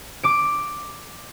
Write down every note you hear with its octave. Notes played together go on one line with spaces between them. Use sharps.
D6 D7